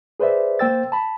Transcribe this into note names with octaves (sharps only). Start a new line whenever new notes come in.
G#4 B4 C5 D5 E5
A#3 C5 G5 E6 A6
A5 B5